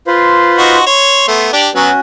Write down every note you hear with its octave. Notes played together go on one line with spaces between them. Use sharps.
F4 B4 C5
D#4 F#4 C6
C#5 C6
A3 B3
D4 G4 D5
F#3 B3 C#4 F#4